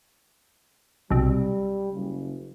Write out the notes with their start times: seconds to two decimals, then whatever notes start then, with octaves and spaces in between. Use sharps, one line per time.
1.10 B1 C3 G3
1.91 F#1 C#3